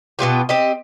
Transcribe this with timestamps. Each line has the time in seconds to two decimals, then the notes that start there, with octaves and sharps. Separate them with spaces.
0.19 B2 B3 F4 G4
0.49 C4 G4 D#5